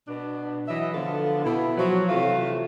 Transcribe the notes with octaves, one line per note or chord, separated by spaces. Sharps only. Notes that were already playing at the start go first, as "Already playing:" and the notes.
B2 D4
E3 F#3 D#5 E5
D3 F3 B3 F4 A4
B2 E4
F3 F#3
C3 E3 A3 F4